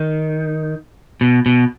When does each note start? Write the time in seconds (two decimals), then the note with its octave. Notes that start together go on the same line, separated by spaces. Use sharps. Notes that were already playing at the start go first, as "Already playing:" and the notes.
Already playing: D#3
1.21 B2
1.46 B2